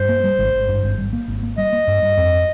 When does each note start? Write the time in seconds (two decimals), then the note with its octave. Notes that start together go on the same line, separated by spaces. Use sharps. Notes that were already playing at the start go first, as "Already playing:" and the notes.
Already playing: G2 C5
0.09 A#3
0.24 G3
0.39 G#1
0.54 G#1
0.68 G2
0.83 G#1
0.98 G3
1.13 A#3
1.28 G#1
1.43 A#3
1.58 G3 D#5
1.73 A#3
1.87 G2
2.02 G2
2.17 F2